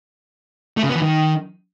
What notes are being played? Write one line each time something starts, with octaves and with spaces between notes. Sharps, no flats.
A3
C#3
B3
E3
D#3